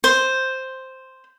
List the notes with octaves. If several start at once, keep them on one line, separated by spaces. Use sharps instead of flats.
C5